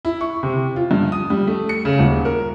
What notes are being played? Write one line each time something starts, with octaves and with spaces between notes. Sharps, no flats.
E4
C#6
C3
F4
G2
D#6
G3
A3
C#7
C#3
D#1
A#4